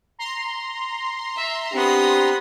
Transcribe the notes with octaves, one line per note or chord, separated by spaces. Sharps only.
A#5 C6
E5
B3 C4 D4 G4 D#6